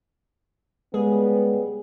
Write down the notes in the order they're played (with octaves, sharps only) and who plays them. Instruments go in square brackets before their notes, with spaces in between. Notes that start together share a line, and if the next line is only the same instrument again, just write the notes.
[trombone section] C#3 G3 B3 [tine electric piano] G#3 [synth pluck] G#4